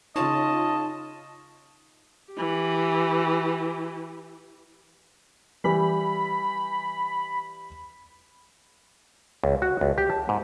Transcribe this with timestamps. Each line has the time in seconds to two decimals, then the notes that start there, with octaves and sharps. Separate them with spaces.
0.16 C#3 D#4 F4 C#5 D#5 A5
2.33 E3 G4
5.64 E3 G3 B5
9.43 C#2
9.62 F#4
9.81 C#2
9.98 G4
10.10 A5
10.29 G#2